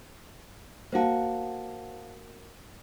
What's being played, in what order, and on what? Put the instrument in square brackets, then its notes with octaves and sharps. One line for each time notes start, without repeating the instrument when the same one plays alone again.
[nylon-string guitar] A#3 F#4 [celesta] C5 F5 A5